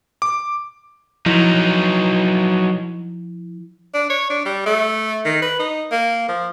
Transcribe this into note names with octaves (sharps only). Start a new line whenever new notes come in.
D6
F3 F#3 D#4 E4
D4
C#5
D4
G3
A3
D#3
B4
D#4
A#3
F3